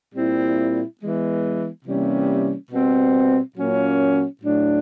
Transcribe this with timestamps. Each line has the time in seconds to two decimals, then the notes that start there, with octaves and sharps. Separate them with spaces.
0.14 A#2 G3 C4 E4
0.99 E3 G#3 B3
1.85 C3 E3 G3 A#3 C#4
2.71 B2 G3 C4
3.56 A#2 F#3 A#3 C#4
4.41 A2 F#3 A3 D4